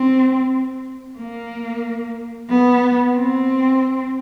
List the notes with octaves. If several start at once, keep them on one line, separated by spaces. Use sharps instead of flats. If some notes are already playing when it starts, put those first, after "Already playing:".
Already playing: C4
A#3
B3
C4